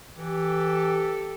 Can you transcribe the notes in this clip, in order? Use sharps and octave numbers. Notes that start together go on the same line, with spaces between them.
E3 G4 A4